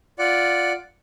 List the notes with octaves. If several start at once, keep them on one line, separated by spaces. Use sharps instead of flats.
F4 D5 F#5